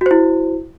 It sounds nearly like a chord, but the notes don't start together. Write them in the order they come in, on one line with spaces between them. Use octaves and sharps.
F#4 C5 E4